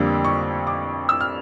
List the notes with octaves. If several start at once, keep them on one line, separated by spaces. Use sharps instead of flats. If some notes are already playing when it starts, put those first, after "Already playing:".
Already playing: F2 D3 G3 A#3 D4
C#6
D6
E6
F6